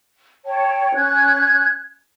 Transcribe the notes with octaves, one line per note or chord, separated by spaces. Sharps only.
C#5 G5 A5
C#4 F#6 G#6